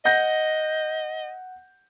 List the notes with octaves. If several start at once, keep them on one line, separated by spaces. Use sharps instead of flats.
D#5 F#5 G6 A#6